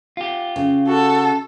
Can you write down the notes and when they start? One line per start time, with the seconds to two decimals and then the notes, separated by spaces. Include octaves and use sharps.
0.17 F4 G4
0.56 C#3
0.88 F#4 A4